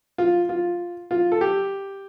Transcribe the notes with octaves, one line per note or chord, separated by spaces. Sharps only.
F4
F4
F4
A4
G4